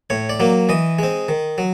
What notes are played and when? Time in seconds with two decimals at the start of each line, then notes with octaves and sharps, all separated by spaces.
0.10 A2 C#5
0.29 D5
0.40 F#3 A#3
0.69 E3 D#5
0.99 G#3 C4
1.29 D#3
1.58 F#3